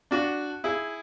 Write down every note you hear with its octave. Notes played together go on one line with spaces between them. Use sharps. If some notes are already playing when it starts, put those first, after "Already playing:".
D4 F#4
E4 G#4